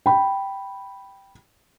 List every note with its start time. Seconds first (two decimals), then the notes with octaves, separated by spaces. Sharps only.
0.06 G5 B5